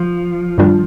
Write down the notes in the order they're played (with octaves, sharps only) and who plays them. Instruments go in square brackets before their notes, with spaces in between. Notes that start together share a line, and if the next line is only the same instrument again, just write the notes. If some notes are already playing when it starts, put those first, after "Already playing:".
Already playing: [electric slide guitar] F3
[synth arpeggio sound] G2 D#3 G3 D4 F4